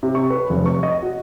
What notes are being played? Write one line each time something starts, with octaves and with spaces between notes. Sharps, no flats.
C3
C#6
B4
F1
C#6
D#5
F#4